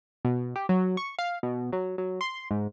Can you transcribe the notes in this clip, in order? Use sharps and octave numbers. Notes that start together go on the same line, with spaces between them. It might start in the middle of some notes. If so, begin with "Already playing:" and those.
B2
G4
F#3
C#6
F5
B2
F#3
F#3
C6
G#2